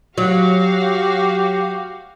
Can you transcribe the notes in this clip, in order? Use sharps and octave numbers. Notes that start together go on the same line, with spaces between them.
F#3 F#4 G4 F5